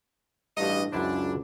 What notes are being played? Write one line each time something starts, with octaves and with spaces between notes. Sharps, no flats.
A1 G2 F4 F#4 D#5
C#2 F#2 D4 E4 C5